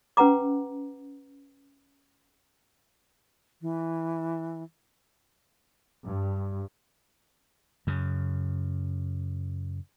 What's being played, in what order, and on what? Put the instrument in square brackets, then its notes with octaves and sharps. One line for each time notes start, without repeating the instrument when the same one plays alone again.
[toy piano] C#4 B4 F#5 A#5 D6
[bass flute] E3
[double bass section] G2
[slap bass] F#2 C#3